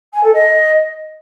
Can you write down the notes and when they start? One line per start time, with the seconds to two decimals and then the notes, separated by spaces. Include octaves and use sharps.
0.13 G#5
0.23 A4
0.33 D#5